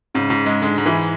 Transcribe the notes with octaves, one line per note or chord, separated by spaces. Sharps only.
G#2 C#3
G#2
G#3
D3 G#3
G#2
E3